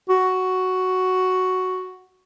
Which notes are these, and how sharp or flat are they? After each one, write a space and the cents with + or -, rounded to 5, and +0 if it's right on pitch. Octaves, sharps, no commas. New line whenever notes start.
F#4 +5